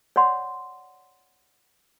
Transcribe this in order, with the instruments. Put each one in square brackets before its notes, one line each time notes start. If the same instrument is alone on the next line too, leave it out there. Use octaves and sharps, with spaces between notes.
[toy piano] C#5 D5 F#5 C6